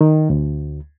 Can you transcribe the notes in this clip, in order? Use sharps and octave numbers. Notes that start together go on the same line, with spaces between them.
D#3
D2